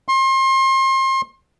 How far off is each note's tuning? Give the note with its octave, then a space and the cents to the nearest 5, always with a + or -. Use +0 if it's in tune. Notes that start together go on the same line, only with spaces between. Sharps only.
C6 +35